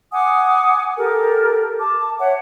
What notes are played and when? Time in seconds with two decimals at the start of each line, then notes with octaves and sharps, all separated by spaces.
0.12 F#5 G#5 D6 D#6
0.97 G4 A4 A#4
1.79 A5 D6
2.20 C#5 E5 F#5